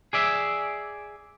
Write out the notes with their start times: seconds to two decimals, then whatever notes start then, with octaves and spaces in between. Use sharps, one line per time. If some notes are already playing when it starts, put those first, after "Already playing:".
0.13 G#4 D5 E5